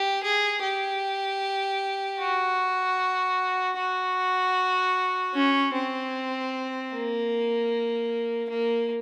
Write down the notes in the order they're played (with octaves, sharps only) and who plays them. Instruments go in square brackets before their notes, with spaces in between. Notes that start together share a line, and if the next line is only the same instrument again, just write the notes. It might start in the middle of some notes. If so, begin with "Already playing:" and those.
Already playing: [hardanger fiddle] G4
G#4
G4
F#4
F#4
C#4
C4
A#3
A#3